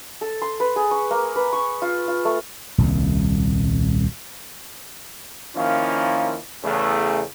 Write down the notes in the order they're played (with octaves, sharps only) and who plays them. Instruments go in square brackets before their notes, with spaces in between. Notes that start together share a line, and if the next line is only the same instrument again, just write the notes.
[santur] A4
C6
B4
G#4
C#6
A#3
B4
C#6
F4
F4
A3
[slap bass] D#1 C2 A#2
[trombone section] D#3 F3 A#3 C#4 E4 F4
E2 C#3 A3